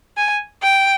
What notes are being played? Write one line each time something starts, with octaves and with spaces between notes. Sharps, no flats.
G#5
G5